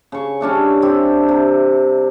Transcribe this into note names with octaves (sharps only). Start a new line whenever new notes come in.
C#3 C#6
G3 C#4 D4 E4
D3 C4 E4 G4
C3